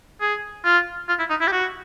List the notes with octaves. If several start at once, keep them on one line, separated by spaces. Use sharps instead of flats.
G#4
F4
F4
E4
D#4
E4
G4
F#4